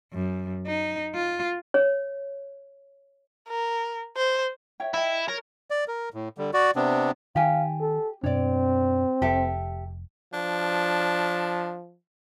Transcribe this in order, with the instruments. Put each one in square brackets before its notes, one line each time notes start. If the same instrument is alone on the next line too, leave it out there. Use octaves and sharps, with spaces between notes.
[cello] F#2
D#4
F4
[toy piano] C#5
[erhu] A#4
C5
[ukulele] C#5 E5 G5
[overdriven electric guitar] E4 [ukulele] D#5 E5 G5
[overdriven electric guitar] A#4 [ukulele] C#5
[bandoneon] D5
A#4
A2
D3 G3
F#4 D5
C3 B3 C4 D4
[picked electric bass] D#3 [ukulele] G4 G#5 [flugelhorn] F5
[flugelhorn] A4
[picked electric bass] F#2 B2 D4 [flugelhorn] C4 [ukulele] C#5 D5
[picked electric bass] F1 [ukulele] G4 A4 E5
[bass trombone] F3 [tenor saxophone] D4